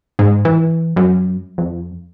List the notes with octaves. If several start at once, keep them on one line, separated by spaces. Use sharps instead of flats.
G#2
E3
F#2
F2